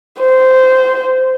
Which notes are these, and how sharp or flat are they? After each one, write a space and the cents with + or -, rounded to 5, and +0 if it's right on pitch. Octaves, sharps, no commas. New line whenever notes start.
C5 -15